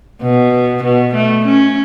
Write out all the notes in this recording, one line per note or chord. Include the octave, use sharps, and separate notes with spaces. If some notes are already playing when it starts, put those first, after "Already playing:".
B2
B2
A3
C#4